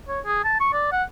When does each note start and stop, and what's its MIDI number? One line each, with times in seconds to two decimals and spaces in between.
0.08 0.20 73
0.25 0.40 68
0.44 0.58 81
0.60 0.68 85
0.73 0.91 74
0.92 1.03 78